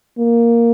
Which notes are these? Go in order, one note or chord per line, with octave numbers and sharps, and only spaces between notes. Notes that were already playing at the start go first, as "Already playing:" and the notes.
A#3